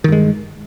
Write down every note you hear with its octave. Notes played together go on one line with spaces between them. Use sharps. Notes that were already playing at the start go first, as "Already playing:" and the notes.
G2 D#3 G#3